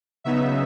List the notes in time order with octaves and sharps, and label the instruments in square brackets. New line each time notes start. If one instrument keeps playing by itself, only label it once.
[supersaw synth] C#3 F#3 B3 D#4 E5